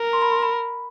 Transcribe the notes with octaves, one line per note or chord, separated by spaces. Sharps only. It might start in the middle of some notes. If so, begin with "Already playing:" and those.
Already playing: A#4
C6
B5
C6
B5